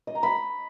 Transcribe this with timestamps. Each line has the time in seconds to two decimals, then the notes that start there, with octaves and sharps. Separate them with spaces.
0.07 D#5
0.15 A#5
0.23 B5